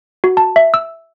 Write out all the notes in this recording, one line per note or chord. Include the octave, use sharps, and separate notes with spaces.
F#4
A5
E5
E6